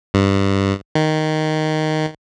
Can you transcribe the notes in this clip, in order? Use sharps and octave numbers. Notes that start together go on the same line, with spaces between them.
G2
D#3